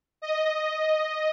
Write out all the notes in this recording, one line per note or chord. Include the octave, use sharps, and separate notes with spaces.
D#5